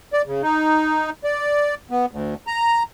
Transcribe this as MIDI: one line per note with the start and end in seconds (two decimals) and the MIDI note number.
0.13 0.22 74
0.26 0.42 49
0.42 1.10 63
1.24 1.75 74
1.91 2.06 59
2.11 2.35 38
2.47 2.83 82